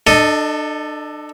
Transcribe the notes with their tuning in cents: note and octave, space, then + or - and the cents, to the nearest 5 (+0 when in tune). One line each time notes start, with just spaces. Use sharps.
D4 +35 A4 +0 D#5 +0